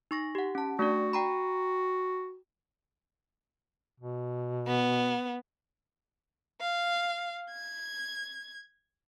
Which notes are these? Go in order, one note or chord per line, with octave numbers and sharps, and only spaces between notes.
D#4 C#6 A#6
G4 F#5
C#4 A5
A3 D4 F#4 D5
G5 A#5 B5
B2
B3
F5
G#6